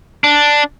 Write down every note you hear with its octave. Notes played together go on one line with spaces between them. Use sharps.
D4